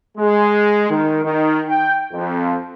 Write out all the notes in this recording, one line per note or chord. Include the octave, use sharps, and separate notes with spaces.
G#3
D#3
D#3
G5
F2